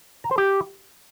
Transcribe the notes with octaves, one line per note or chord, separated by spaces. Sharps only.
A#5
C5
G4